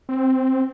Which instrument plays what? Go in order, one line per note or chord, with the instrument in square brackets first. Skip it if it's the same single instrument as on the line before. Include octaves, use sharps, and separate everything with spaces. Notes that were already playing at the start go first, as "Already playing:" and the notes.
[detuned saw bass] C4